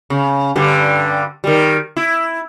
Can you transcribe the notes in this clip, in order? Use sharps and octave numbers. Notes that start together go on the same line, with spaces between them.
C#3
G2 D3 G3
D#3 G3
E4